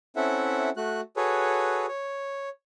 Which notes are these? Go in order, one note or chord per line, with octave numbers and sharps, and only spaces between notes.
C4 C#4 E4 A4 E5 F#5
A3 F#4 F#6
F#4 G#4 A4 B4 C#5
C#5